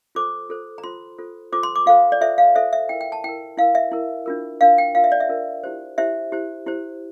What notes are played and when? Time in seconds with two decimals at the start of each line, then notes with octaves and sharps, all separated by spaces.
0.15 F4 A4 C5 D6
0.49 F4 A4 C5
0.78 A#5
0.84 F4 A4 C5 C6
1.18 F4 A4 C5
1.52 F4 A4 C5 D6
1.63 C6
1.76 D6
1.86 F4 A4 C5 F5
2.12 D5
2.21 F4 A4 C5 E5
2.38 F5
2.55 F4 A4 C5 E5
2.73 E5
2.89 E4 A#4 G5
3.01 G5
3.12 A5
3.24 E4 A#4 G5
3.58 E4 A#4 F5
3.75 E5
3.92 E4 A#4
4.26 D4 F4 A#4
4.61 D4 F4 A#4 F5
4.78 G5
4.95 D4 F4 A#4 F5
5.04 E5
5.12 D5
5.20 E5
5.29 D4 F4 A#4
5.64 E4 G4 C5
5.98 E4 G4 C5 E5
6.32 E4 G4 C5
6.67 E4 G4 C5